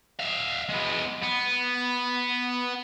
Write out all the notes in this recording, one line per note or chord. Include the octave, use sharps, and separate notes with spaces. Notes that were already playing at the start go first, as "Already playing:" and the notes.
E5 F5
G#3 B3
B3